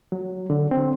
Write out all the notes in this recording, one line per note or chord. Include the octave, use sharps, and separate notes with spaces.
F#3
D3
C4